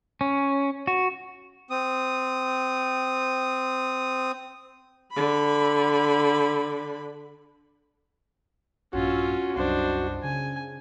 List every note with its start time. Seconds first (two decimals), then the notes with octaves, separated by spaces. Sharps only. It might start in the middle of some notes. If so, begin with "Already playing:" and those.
0.21 C#4
0.87 F#4
1.70 C4 D#6
5.12 D3 B5
8.93 A#1 G2 C#4 F4 F#4 E6
9.56 C2 F#2 D4 C5 D#5
10.23 C#3 G#5